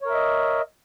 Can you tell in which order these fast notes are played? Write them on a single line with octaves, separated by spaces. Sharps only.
C#5 A#4 E5 D#5